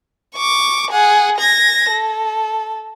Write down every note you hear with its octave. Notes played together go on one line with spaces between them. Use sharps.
C#6 D6
G#4 F#5
G#6 A#6
A4